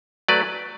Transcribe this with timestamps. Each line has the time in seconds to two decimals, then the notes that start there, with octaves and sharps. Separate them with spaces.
0.28 F#3 A3 B4 D5